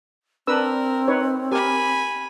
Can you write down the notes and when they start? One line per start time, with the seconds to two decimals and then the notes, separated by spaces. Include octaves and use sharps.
0.47 C4 D4 A#4 B4 E6
1.08 D#4 B4 C#5
1.51 G4 A#4 G#5 B5